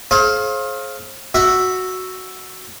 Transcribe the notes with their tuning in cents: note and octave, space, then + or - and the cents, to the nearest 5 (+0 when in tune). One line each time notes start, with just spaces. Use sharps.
G#4 +40 C5 +40 F5 +0
F#4 +0 E5 +0